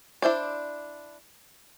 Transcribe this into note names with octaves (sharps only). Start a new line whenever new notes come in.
D4 E4 C5 D5